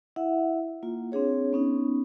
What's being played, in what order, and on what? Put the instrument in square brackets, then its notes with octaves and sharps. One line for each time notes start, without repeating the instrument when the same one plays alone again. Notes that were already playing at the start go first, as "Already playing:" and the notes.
[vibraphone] E4 E5 F#5
A#3 F4
C4 D4 G#4 C#5
B3 C#4 D#4